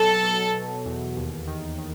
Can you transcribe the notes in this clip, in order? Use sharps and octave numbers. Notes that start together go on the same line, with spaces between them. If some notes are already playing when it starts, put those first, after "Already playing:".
Already playing: B2 F#3 A4
B2
B2
E2
D#2
D#3
D#3